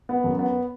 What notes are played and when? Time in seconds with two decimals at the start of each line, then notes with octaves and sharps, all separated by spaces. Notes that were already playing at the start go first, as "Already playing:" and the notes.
0.09 B3
0.24 F#2
0.39 B3